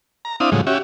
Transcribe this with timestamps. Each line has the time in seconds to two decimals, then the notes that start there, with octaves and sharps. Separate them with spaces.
0.25 A#5
0.40 C4 D4 E4 F5 D#6
0.52 A2 C#3 F3 F#3 G#3
0.67 C#4 F#4 G4 E5